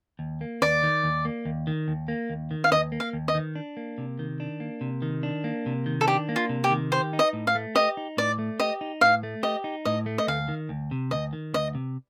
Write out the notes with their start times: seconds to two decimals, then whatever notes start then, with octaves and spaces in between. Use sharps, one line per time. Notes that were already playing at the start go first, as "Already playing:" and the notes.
0.19 D#2
0.41 A#3
0.62 D#2 D5
0.83 D#3
1.04 D#2
1.25 A#3
1.45 D#2
1.67 D#3
1.88 D#2
2.08 A#3
2.30 D#2
2.51 D#3
2.64 F5
2.72 D#2 D#5
2.92 A#3
3.00 F5
3.13 D#2
3.28 D#5
3.35 D#3
3.55 D4
3.77 A#3
3.98 C3
4.19 D#3
4.40 D4
4.60 A#3
4.81 C3
5.02 D#3
5.23 D4
5.44 A#3
5.66 C3
5.86 D#3
6.01 A4
6.07 D4 G4
6.29 A#3
6.36 F4
6.49 C3
6.64 G4
6.70 D#3
6.92 G4 C5
7.13 D#4
7.19 D#5
7.33 A2
7.47 F5
7.55 A3
7.75 G4 D#5
7.97 D#4
8.17 A2 D5
8.39 A3
8.60 G4 D#5
8.81 D#4
9.01 A2 F5
9.23 A3
9.43 G4 D#5
9.64 D#4
9.85 A2 D#5
10.06 A3
10.18 D#5
10.28 D2 F5
10.48 D#3
10.69 D2
10.91 C3
11.11 D2 D#5
11.33 D#3
11.54 D2 D#5
11.75 C3